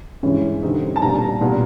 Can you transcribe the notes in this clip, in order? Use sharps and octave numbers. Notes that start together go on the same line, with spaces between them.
G2 E3 G#3 C#4
D3 G3 C4 D#4
A5
A#2 G3 B3 D4 A#5
A#2 G3 B3 D4